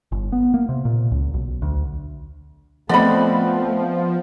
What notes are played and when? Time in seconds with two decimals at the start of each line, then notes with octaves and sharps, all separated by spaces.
0.12 G1
0.32 B3
0.54 A#3
0.69 C3
0.85 A#2
1.11 C#2
1.34 B1
1.62 D2
2.89 F3 A3 B3 C4 D5 D#5 B5